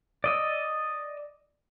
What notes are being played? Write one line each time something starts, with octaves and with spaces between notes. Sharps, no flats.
D5 D#5 E6